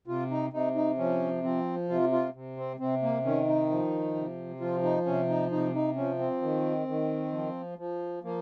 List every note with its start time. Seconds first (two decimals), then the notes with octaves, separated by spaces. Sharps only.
0.07 C3 F4
0.30 D#4
0.53 C3 D#4
0.75 D#4
0.98 F3 C#4
1.44 F3 C4
1.89 C3 F4
2.12 F4
2.34 C3
2.57 C4
2.79 C3 C4
3.03 A#3
3.24 D#3 C#4
3.48 D#4
3.70 F3
4.15 C3
4.60 F3 F4
4.83 D#4
5.06 C3 C#4
5.29 D#4
5.51 C3 D#4
5.75 D#4
5.96 F3 C#4
6.19 C4
6.42 D#3
6.88 D#3
7.33 F3
7.78 F3
8.23 F3 A#3